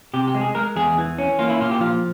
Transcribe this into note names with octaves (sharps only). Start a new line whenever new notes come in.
C3 G4
G4
G#3
G#4
G#3 A#4
E2 G#4
E3
C#4
A#3 F4
E4
A#2 F4
G4
F3 F4